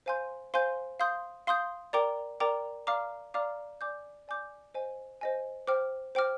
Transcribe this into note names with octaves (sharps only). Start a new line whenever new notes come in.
C5 F5 G#5 C6 G6
C5 F5 G#5 C6 G6
F5 C6 D#6 G6
F5 C6 D#6 G6
A#4 D5 G5 A#5 D6
A#4 D5 G5 A#5 D6
D5 F5 A#5 D6 F6
D5 F5 A#5 D6 F6
D5 G#5 D6 G6
D5 G#5 D6 G6
C5 D#5 G#5
C5 D#5 G#5
C5 G5 D6 F6
C5 G5 D6 F6